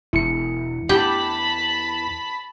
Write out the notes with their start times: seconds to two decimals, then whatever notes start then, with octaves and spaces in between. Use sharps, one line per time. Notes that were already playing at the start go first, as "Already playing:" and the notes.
0.13 E1 E4 C#7
0.89 E2 G4 A5 B5